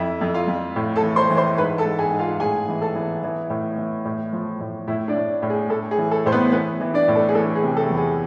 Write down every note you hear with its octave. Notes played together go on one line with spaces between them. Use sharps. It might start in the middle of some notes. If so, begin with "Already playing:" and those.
Already playing: F2 E4 E5
F2
F4 F5
F2
A2
A4 A5
E3
C5 C6
E3
C5 C6
G#2 B4 B5
A4 A5
G#2
G#4 G#5
G#2
F4 F5
A2 G#4 G#5
E3
A4 A5
E3
E3
A2
E3
A2
F3
A2
A2 E4 E5
D4 D5
A2
A2
G#4
A2 A4
G#4
E3
A4
A2 C5
B3 B4
E3 B3 B4
E3
D4 D5
A2
A4
G#4
E3 A4
G#4
C3
A4
E2
G#4